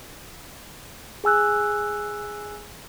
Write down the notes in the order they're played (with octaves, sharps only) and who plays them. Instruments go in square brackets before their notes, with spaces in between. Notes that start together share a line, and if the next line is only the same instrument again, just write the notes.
[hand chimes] G#4 G#5 E6 F#6